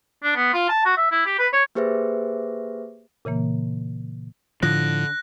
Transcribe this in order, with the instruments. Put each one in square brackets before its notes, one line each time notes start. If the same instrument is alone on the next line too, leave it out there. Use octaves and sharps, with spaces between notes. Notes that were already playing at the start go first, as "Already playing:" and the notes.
[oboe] D4
B3
F4
A5
F#4
E5
E4
G4
B4
C#5
[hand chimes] A#3 G4 G#4 B4 C5 E5
[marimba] A#2 C#3 E3 A#3
[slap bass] A2 F3 [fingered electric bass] D3 [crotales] F#6 A#6